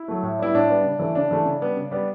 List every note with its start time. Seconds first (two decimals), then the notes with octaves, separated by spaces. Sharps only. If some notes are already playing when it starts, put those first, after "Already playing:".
Already playing: E4
0.08 F#3 A3
0.23 A2
0.39 G3 B3 E4
0.54 A2 D4
0.70 G3 B3
0.84 C#3
0.99 E3 A3
1.15 C#3 D4
1.31 E3 A3
1.45 C#3
1.61 G3 B3
1.77 C#3
1.91 G3 B3